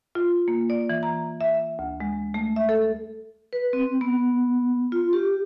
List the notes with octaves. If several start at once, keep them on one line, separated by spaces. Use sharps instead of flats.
F4
A#3
D5
E3
A#5
E5
D2
G#3
A3
E5
A4
B4
C4
B3
F4
G4